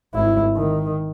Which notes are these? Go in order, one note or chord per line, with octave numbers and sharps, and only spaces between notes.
G#1 E4
D#3